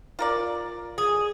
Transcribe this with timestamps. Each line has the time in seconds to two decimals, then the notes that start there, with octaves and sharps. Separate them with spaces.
0.19 F4 A#4 D5
0.98 G#4 D#6